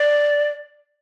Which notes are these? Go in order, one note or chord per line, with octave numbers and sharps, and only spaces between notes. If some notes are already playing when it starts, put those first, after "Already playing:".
Already playing: D5